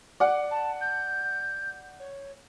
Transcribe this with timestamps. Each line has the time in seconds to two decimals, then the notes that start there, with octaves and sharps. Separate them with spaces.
0.20 D5 F#5
0.51 A5
0.81 G6
1.99 C#5